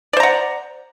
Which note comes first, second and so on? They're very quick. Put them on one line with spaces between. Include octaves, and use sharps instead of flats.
D5 C5 A#5 F#5